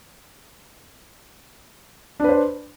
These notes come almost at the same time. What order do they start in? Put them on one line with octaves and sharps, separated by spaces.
D4 B4 C5